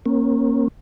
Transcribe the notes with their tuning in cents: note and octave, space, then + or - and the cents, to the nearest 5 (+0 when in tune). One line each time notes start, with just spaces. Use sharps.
A#3 +0 C#4 -30